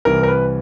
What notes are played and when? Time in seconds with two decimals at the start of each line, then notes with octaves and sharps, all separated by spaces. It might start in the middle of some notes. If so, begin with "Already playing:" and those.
0.05 C2 C3 E3 A#4
0.23 A#4
0.28 B4